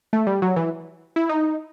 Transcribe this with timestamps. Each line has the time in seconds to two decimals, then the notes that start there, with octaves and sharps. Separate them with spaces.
0.13 A3
0.27 G3
0.42 F#3
0.56 E3
1.16 E4
1.29 D#4